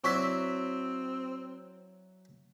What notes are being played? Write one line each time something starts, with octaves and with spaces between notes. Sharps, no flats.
F#3 C4 E4 D5 C#6 B6